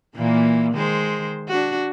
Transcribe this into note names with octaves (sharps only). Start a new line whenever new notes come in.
A#2 E3 A#3
D#3 G#3 C5
D4 F#4